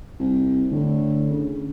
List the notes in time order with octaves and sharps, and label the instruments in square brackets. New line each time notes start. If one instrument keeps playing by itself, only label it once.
[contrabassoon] C2
[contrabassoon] A2 [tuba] D3
[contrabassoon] C#3